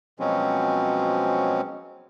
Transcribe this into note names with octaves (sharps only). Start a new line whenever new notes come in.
B2 F3 F#3 G#3 C4 C#4